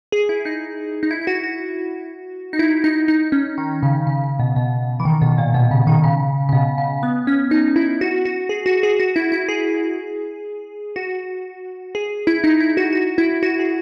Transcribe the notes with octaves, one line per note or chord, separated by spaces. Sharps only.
G#4
E4
D#4
D#4
E4
E4
F#4
F#4
D#4
E4
D#4
D#4
C#4
D#3
C#3
C#3
C#3
B2
B2
E3
D#3
B2
A#2
B2
C#3
D#3
C#3
C#3
B2
C#3
B3
C#4
D#4
E4
F#4
F#4
G#4
F#4
G#4
F#4
E4
E4
G#4
F#4
G#4
E4
D#4
E4
F#4
F#4
E4
F#4
G#4